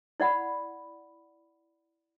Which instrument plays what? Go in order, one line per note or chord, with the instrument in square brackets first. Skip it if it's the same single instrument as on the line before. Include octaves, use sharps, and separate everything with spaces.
[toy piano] E4 D5 F#5 B5